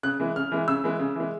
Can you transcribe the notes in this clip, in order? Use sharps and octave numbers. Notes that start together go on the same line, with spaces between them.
C#3 F#6
E3 G#3
C#3 F6
E3 G#3
C#3 E6
E3 G#3
C#3
E3 G#3